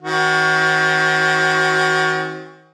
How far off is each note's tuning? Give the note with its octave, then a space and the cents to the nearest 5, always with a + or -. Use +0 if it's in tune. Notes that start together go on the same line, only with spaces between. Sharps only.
D#3 +35 C4 +45 F#4 +15